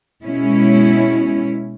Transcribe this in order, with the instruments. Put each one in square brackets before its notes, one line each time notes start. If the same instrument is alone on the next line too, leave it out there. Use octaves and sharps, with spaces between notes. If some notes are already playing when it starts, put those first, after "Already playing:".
[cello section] B2 G#3 C#4 E4